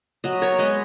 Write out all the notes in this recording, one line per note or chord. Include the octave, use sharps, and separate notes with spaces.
F#3 B4 D#5
B3 A#4 C#5
G#3 B4 D#5